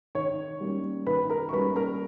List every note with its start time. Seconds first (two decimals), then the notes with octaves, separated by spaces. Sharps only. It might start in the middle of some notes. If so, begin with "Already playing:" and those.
0.15 D#3 C#5 C#6
0.60 G3 A#3 C#4
1.06 D#3 B4 B5
1.30 A#4 A#5
1.49 C#6
1.53 G3 A#3 C#4 B4 B5
1.76 A#4 A#5